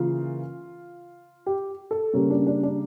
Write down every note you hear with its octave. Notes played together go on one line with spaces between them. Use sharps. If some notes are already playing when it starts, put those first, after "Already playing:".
Already playing: C#3 E3 A#3 F4
G4
A4
C#3 G3 A#3 C#4
D4
D4
D4